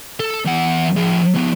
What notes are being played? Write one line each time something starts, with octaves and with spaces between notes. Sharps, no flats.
A4
E2 F#5
F3 G#4
F3 B3